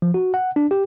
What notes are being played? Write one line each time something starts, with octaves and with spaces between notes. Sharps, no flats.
F3
F#4
F#5
D4
G4